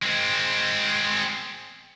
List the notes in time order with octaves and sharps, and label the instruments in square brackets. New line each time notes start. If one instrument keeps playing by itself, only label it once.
[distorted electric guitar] G#3 C4